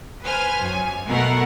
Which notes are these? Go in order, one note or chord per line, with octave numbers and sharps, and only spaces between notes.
B4 C5 G#5 F6
F#2 G#5
B2 A3 A#4 F#5